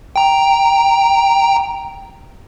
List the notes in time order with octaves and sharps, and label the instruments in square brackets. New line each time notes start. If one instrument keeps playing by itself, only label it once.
[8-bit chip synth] G5 A#5